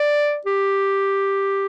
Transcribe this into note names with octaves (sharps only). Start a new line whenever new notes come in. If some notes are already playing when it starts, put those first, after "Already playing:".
Already playing: D5
G4